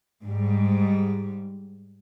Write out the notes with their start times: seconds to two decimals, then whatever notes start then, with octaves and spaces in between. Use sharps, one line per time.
0.24 G#2 G3